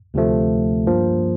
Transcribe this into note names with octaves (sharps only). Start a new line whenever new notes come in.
D2 C3 F3 A3
G2 F3 A#3